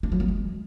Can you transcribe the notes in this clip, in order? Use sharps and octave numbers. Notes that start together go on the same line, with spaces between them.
D4
F#3
B3
G#3